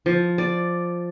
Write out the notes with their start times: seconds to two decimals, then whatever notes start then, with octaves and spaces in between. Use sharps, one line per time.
0.06 F3
0.38 D5